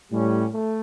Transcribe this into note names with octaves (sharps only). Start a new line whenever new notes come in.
A2 G3 C#4
A3